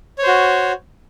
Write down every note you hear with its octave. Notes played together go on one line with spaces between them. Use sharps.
F#4 C5 C#5